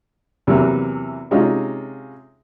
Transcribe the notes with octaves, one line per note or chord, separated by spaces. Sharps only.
E2 C3 E3 F#3 A#3
C3 G#3 C#4 D#4 F4